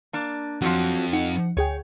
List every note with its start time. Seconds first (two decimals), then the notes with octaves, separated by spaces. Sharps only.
0.13 A#3 D4
0.62 F2 F3 F#3 F#4
1.13 D#4 F#5
1.57 D2 G#4 C#5 G5